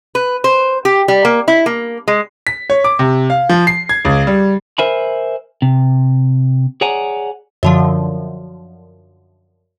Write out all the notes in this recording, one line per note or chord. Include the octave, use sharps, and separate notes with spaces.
B4
C5
G4
G3
A#3
E4
A#3
G#3
B6
C#5
D6
C3
F5
F3
C7
G#6
C#2
G3
A#4 C5 E5 G#5 B5
C3
G#4 C#5 D5 F#5 G#5 A#5
F#2 D3 F3